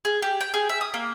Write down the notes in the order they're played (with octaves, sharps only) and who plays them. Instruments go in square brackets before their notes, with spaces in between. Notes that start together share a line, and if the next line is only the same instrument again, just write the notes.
[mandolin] G#4
G4
G5
G#4
E5
D#6
A#3